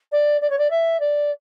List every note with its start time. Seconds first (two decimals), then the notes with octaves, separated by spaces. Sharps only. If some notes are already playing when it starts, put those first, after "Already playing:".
0.12 D5
0.41 D5
0.50 C#5
0.58 D5
0.70 E5
1.00 D5